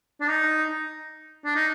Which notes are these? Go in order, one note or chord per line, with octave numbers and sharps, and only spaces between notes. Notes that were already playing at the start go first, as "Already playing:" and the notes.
D4
D#4
D4
D#4